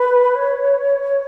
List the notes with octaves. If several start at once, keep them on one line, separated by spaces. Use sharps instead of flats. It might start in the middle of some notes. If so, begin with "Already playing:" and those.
Already playing: B4
C#5